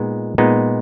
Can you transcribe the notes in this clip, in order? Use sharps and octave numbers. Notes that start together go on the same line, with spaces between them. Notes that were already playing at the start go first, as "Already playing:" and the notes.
Already playing: A#2 G#3 B3 D#4
A#2 G#3 B3 D#4